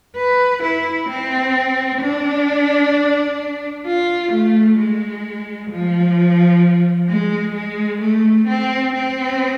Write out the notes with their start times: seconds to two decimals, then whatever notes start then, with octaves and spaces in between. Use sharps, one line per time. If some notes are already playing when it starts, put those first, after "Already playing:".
0.16 B4
0.63 E4
1.09 C4
2.02 D4
3.86 F4
4.32 A3
4.78 G#3
5.70 F3
7.09 G#3
7.55 G#3
8.01 A3
8.47 C4
8.94 C4